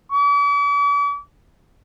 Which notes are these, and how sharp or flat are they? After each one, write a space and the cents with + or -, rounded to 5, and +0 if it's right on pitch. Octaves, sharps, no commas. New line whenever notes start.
D6 -45